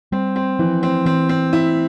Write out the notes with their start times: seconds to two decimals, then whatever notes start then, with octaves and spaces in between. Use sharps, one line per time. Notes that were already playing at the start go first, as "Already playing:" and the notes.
0.12 G3 C4
0.36 C4
0.59 E3 F3
0.83 C4
1.06 E3 C4
1.29 C4
1.53 E4